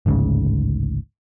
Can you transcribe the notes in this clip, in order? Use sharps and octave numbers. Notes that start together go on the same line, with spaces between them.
A1 D2 G#2 C#3